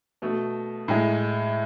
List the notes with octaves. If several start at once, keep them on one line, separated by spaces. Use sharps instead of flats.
B2 A3
A2 G#3